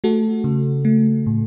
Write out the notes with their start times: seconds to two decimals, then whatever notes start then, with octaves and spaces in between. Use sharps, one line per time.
0.04 A3 F#4 A4
0.44 C#3
0.85 A3
1.27 A2